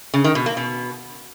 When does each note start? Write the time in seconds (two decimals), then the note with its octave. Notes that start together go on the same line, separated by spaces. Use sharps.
0.14 C#3
0.24 D#3
0.35 B2
0.46 A#3
0.57 B2